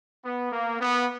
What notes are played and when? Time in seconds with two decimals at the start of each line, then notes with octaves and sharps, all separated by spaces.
0.24 B3
0.52 A#3
0.80 B3